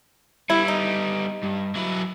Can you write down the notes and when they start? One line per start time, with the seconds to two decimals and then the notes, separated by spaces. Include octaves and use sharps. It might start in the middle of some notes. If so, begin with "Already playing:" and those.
0.50 G3 B3 E4
0.68 D#4
1.43 G2
1.75 F#3 E4